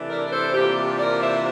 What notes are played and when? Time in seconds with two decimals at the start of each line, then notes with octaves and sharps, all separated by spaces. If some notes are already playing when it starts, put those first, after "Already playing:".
Already playing: C3 E3 A3 D4
0.09 A#4 D5
0.26 A#4
0.32 A4 C5
0.54 C3 E3 A#3 D4 F4 G4
0.99 A#4 D5
1.22 C5 E5